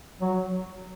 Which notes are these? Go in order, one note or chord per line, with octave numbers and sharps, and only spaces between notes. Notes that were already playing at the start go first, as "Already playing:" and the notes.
F#3